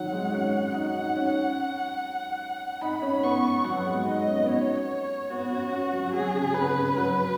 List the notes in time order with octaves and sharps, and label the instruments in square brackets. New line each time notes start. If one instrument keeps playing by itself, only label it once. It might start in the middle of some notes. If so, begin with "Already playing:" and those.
Already playing: [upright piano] D#3 F#3 [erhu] F#5
[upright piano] G#3
C#4
D#4
C#4
[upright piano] D#4 [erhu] B5
[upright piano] C#4
[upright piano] B3 [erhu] C#6
[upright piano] F#3 [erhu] F#5
[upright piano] B3
G#3
[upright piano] D#4 [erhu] D#5
[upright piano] C#4
B3
[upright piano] C#4 [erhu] C#5
[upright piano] B3 [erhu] F#4
[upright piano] C#4
C#4
F#3
[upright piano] F#3 [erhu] G#4
[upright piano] C#3
[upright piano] C#3 [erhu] B4
[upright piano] C#3
[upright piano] F#3 [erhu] B4